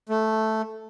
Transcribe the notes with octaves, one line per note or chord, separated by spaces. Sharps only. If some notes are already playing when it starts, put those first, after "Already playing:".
A3